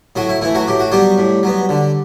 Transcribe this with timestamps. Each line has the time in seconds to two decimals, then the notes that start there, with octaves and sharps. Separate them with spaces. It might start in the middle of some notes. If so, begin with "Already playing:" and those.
0.16 A2 F#3 F#4
0.29 E4
0.41 E3 A3 E4
0.55 F#3 F#4
0.68 A2 G4
0.80 F#4
0.92 F#3 G3 B3 G4
1.18 A2
1.43 F#3 B3
1.69 D3